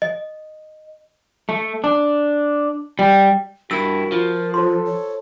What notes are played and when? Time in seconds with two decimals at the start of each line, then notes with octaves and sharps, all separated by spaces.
0.02 D#5
1.49 A3
1.84 D4
2.99 G3
3.71 G2 E4 F#4 A#4 E6
4.12 F3 F4
4.54 F4 A4 C5 C6
4.86 C#5